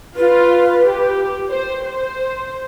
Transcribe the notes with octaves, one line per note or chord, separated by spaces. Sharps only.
F4 B4
G4
C5
C5